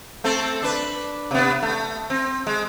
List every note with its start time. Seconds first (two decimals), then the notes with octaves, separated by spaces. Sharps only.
0.24 A3 C4 A4
0.62 D4 B4
1.31 C3 B3
1.63 A3
2.10 C4
2.47 G#3